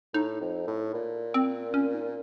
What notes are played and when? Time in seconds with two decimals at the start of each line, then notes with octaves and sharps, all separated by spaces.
0.14 A2 D#4
0.41 F2
0.67 A2
0.94 A#2
1.34 C4
1.74 C#4
1.94 D#4